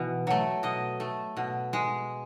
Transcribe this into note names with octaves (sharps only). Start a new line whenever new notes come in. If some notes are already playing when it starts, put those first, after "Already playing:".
Already playing: B2 E3
F#3 A3
B2 D#5
A3
B2
G#3